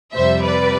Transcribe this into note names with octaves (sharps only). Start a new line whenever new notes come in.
F2 C3 G3 C5 E5
B4 D5